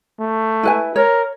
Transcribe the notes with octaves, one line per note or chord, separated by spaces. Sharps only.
A3
E4 B4 G#5
A#4 C#5